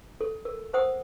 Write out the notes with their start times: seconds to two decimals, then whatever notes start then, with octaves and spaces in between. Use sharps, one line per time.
0.21 A4
0.45 A#4
0.74 A#4 C5 F#5 D#6